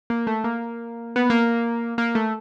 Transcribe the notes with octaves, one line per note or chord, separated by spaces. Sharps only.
A#3
A3
A#3
B3
A#3
A#3
A3